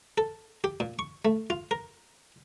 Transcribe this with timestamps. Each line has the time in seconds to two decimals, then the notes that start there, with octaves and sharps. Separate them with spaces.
0.18 A4
0.64 G4
0.80 A#2
0.99 C#6
1.25 A3
1.50 F4
1.71 A#4